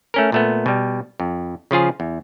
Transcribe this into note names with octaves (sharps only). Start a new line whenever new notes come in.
A3 C#4 A#4
A#2 A3 B3
B2 G3
F2
C#3 F3 F4 G#4
E2